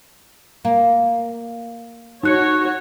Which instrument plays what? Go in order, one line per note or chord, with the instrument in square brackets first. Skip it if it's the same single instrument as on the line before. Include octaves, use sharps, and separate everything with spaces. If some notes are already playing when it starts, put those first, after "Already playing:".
[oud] A#3
[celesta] D#4 F#6 C#7 [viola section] F#4 C#5